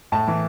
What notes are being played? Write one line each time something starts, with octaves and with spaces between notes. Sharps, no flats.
A2 A5
E3